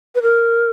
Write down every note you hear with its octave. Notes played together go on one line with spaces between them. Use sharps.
B4
A#4